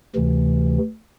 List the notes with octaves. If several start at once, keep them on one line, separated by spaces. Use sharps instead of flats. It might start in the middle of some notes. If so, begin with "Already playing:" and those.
D2 C3 E3